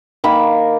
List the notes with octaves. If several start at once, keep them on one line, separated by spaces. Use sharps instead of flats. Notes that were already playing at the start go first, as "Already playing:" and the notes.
D#3 A#3 B5